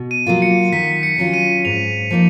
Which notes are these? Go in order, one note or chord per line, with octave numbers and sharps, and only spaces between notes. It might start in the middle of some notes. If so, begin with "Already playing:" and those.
Already playing: B2
D#7
F#3 A#3 F4
C#7
D#3 B6
C#7
F#3 C#4 F4
D#7
G#2 F7
F3 A#3 D#4